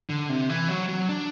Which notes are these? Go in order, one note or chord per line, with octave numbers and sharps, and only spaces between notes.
D3
C3
E3
F#3
F#3
D4